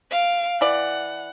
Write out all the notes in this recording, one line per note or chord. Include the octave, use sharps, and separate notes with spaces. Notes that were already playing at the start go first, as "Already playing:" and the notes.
F5 D7
E3 D5 F#5